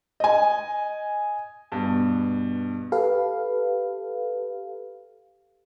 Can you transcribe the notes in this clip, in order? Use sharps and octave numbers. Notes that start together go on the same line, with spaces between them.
D#5 G#5
G2 B2
G4 A4 B4 F5